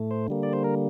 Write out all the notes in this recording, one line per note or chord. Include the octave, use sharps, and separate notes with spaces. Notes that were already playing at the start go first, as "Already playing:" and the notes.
Already playing: A2 A3
C5
D3 G3 A#3
D5
C5
A#4